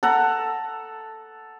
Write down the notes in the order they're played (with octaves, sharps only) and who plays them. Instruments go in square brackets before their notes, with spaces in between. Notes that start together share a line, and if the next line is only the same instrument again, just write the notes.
[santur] A4 F#5 A#5